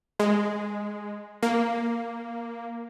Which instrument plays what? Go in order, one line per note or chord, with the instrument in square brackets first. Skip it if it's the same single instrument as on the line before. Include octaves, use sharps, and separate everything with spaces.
[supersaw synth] G#3
A#3